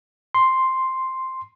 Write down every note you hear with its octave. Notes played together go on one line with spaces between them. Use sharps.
C6